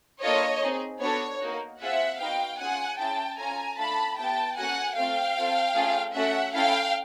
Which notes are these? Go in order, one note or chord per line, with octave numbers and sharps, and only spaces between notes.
A#3 D4 F4 A4 C#5 D#5
C4 D#4 G#4
B3 D4 F#4 A4 C#5
A#3 D#4 F#4
C4 F4 G#4 E5 F#5
B3 D#4 F#4 F5 G5
C#4 F4 G#4 F#5 G#5
C#4 E4 G#4 G5 A5
C#4 F4 A4 G#5 A#5
A3 D4 F4 A4 A5 B5
B3 E4 G4 G5 A5
A#3 C#4 F#4 A4 F#5 G#5
A3 C4 F4 F5 G5
C4 F4 A4
A3 C#4 F4 G#4
A3 C#4 F#4 A4 E5 F#5
C#4 E4 A4 F5 G5